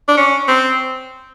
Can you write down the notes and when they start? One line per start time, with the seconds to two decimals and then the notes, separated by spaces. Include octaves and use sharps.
0.08 D4
0.17 C#4
0.48 C4